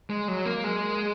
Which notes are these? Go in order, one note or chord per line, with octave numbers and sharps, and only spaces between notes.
G#3
F#3
A#3
G#3